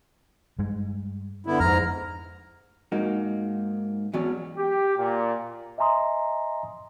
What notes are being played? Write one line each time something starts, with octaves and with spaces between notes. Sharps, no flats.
G2 G#3
D3 B3 E4
F2 G#2 A#5 F6
G#2 A#3 D#4 F#4
E2 B2 F#3 C#4 D5
G4
A#2
D#5 E5 G#5 A#5 C6 D#6